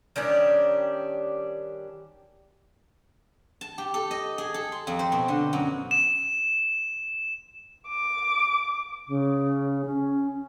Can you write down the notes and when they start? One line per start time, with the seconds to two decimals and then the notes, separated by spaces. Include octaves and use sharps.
0.16 D#3 G3 C#4 D4
3.61 A5
3.78 G4
3.94 A4
4.11 D#5
4.38 G#4
4.54 A4
4.72 C6
4.87 F2
4.99 C5
5.12 B2
5.28 D3
5.53 F#2
5.91 E7
7.88 D6
9.07 C#3
9.85 C#4